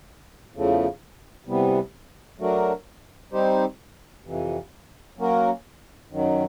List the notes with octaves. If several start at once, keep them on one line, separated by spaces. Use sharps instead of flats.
E2 C#3 F3 A3
C3 E3 G3 B3
F#3 A3 D4 F#4 A#4
G3 C4 D#4 G4 C5
F2 C3 E3
F#3 A#3 C#4 F#4 A#4
F#2 D#3 F#3